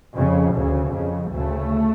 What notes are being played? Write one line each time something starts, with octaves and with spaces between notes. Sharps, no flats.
F2 C#3
D2 C#3
F2 C#3
D2 C#3 A3